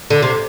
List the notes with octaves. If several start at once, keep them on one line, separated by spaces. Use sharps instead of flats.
D3
C3